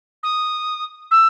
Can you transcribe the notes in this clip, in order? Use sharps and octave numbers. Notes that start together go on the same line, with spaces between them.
D#6
E6